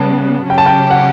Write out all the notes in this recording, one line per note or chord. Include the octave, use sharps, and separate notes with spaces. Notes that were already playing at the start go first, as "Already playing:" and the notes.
Already playing: C#3 G3 B3 A5
C#3 F#3 C#4 G4 G5
A5
G5
F#5